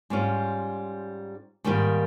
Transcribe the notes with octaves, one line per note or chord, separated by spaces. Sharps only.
G#2 G3 C#4 F4
G#2 D#3 G3 A#3 F4